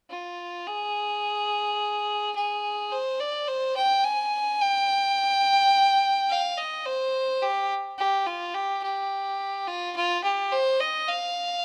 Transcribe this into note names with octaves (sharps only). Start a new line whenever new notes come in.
F4
G#4
G#4
C5
D5
C5
G5
G#5
G5
F5
D#5
C5
G4
G4
F4
G4
G4
F4
F4
G4
C5
D#5
F5